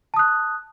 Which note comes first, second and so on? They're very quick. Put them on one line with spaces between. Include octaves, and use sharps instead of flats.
A5 D#6 F#6